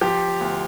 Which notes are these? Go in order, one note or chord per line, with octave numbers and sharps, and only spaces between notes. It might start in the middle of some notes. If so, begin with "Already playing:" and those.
F3 G4
D2